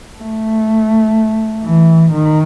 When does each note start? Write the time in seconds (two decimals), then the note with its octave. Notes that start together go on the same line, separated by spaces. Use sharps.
0.18 A3
1.63 E3
2.12 D#3